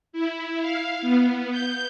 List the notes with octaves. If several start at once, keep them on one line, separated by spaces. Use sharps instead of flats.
E4
F5
B3
G6